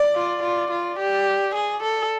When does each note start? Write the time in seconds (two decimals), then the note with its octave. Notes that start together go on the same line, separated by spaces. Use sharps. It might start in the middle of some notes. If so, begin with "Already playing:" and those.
Already playing: D5
0.15 F4
0.43 F4
0.71 F4
0.99 G4
1.55 G#4
1.83 A4